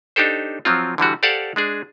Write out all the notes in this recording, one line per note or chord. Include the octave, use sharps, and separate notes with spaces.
D4 D#4 G4 A4 C5
F3 F#3 C4 F4
D3 E3 G3 F#4
G4 A4 C5 D5 F5 F#5
G#3 D4 G#4